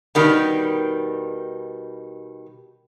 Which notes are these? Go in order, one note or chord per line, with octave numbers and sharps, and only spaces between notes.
B2 D#3 G3